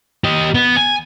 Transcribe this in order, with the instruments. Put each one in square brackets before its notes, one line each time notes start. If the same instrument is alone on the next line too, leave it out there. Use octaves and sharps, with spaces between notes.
[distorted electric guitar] G4 D#5
B3
G#5